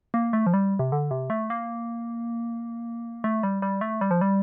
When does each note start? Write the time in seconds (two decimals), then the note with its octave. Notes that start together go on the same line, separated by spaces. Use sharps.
0.14 A#3
0.33 A3
0.46 F3
0.53 G3
0.79 C3
0.92 D3
1.11 C3
1.30 A3
1.50 A#3
3.24 A3
3.43 G3
3.62 G3
3.81 A3
4.01 G3
4.11 F3
4.21 G3